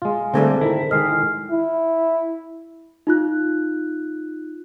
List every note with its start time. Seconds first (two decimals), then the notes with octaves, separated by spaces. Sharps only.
0.02 G#3 F4
0.34 D3 G3 A3 C4 D4 G#4 C5
0.61 D#3 E4 A#5
0.91 D#3 G#3 D#5 F6 C7
1.50 E4
3.07 D#4 F4 F#6